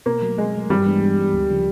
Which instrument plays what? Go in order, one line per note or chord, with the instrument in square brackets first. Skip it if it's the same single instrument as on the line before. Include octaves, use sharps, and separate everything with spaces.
[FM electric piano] B2 [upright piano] A#3
[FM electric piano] F#3 A3
[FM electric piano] B2 [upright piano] G#3
[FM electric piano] F#3 A3
[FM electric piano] G2 [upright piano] G3
[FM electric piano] E3 G#3 B3 D4
G2
E3 G#3 B3 D4
D2
C#3 F3 G#3